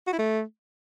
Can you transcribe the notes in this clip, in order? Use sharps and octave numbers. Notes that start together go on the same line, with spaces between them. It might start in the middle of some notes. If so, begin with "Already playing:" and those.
F#4
E4
A3